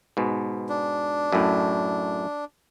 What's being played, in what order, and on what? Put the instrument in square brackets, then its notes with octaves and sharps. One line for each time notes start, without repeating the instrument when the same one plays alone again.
[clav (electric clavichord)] G#2 B2
[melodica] D4
[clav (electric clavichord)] F#2 A2